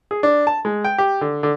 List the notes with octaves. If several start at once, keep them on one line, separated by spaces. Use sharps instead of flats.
G#4
D4
A5
G#3
G5
G4
D3
D3